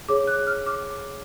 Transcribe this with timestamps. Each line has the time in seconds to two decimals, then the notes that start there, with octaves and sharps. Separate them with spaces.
0.08 G#4 C#5 D6
0.27 F#6
0.47 F6
0.66 D6